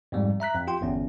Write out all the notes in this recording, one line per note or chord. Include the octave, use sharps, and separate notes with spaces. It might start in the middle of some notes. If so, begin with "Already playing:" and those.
F2 G#2 G3 G#3
E5 A#5 F#6 B6
F2
F4 G4 G5 C6
G1 E2 C#4